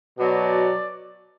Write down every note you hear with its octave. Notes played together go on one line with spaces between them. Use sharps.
B2 F#3 D5